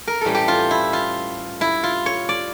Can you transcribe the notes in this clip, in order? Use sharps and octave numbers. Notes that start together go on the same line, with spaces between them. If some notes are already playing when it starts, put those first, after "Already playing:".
A#4
A2 E3 G3 C#4 A4
G4
F4
E4
F4
E4
F4
C#5
D5